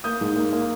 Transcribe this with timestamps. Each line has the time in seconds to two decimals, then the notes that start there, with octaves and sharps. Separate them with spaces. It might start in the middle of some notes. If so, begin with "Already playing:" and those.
0.04 A#3 D#6 G6
0.21 G#2
0.36 A#3
0.53 A#3